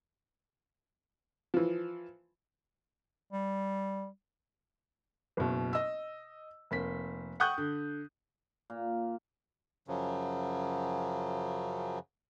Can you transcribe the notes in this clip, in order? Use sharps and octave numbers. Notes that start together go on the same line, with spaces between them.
E3 F3
G3
F#1 B2
D#5 E6
F1 A#3 B6
F#5 G5 C#6 D#6 F#6 G6
D3
A#2
F#2 C#3 F3 F#3